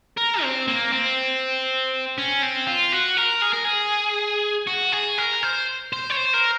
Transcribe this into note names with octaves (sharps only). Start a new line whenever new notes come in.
A#4
C4
A#3
C4
C#4
C4
F4
F#4
A#4
G#4
A#4
G#4
F#4
G#4
A#4
C5
C5
C#5
C5
A#4